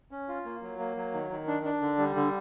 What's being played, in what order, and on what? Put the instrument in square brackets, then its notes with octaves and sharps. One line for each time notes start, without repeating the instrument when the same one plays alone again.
[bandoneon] C#4
F4
A#3
F#3
A#3
F#3
D#3
D#3
D4
D4
D3
G3
D3